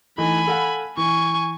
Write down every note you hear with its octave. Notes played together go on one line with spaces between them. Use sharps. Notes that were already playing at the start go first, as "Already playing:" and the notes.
E3 A3 D#4 G#5 B5
A4 F5 F#5
E3 G#5 C#6